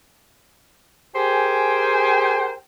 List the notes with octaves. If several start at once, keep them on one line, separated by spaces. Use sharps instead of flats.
G4 G#4 A#4 C5 G5 G#5